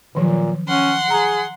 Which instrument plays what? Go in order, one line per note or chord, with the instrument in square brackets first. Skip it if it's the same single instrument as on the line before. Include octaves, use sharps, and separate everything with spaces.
[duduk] A#2 [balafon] D#3 F3 F#3
[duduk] C#4 [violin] F#5 C6
[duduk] G#4 [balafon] A#5